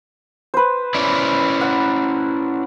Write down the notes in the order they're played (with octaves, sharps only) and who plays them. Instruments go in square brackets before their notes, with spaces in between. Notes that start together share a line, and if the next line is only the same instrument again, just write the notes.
[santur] B4 C5
[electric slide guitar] C#4 E4 D5
[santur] F#5